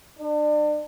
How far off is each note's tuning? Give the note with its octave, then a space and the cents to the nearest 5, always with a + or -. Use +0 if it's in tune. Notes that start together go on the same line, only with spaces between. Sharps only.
D4 +35